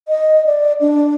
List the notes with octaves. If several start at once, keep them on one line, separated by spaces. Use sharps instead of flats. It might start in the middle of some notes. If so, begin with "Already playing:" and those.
D#5
D5
D4